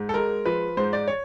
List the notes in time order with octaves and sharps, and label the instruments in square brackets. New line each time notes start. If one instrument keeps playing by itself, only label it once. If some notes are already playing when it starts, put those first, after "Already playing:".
Already playing: [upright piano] G#2
A4
G#3 A#4
F3 B4
G#2 C5
D5
C#5